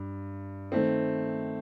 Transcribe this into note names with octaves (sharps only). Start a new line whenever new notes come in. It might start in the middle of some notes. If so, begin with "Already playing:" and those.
Already playing: G2
D#3 A3 C4